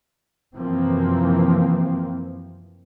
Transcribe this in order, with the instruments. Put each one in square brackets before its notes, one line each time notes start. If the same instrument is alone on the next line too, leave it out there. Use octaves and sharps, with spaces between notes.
[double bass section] F#2 C3 E3 F3 A#3 C4